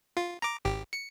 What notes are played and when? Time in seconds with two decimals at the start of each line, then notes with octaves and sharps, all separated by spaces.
0.17 F4
0.42 A#5 D6
0.65 G#1 G4
0.93 C#7